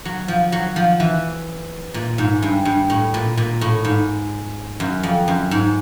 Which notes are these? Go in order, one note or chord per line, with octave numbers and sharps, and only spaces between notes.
F#3
F3
F#3
F3
E3
A#2
G#2
G2
G2
A2
A#2
A#2
A2
G#2
F#2
F2
F#2
G#2